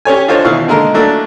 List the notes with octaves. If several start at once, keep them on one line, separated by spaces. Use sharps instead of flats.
C#4 G4 C#5 G#5
D4 F4 C5 C#5 D#5
B2 D#3 E3 F5 C#6
D3 G#3 A#3 A#4
F#3 A3 A#3 D4 A#4